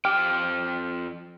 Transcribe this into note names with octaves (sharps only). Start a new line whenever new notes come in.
F2 G4 G5 F6